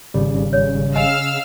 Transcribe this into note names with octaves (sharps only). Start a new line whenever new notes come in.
G#1 C#3 G3
C#5
D#5 F5 G#5 E6 F6